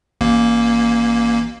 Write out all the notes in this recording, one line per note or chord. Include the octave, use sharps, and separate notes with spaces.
A1 A#3